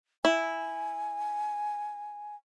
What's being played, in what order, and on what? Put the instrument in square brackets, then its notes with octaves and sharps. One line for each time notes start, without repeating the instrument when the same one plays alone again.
[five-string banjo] E4 [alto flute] G#5